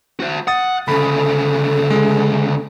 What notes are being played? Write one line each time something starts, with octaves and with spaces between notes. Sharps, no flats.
F#4 C5
F#5 D#6 A6
D2 C#3 A4 B5
G#3